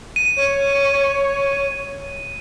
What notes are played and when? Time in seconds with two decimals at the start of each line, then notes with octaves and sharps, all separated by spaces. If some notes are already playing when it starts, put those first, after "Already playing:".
0.16 D#7
0.37 C#5